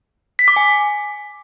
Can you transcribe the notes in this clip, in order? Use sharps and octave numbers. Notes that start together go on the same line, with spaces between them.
B6
D6
G#5